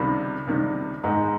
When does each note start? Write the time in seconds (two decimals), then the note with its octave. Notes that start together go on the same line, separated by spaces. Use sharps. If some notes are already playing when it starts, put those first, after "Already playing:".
Already playing: C#2 C3 D#3 G3 B5
0.47 C#2 C3 D#3 G3
1.03 G#2 D#3 G#3 B3 D#4 A#5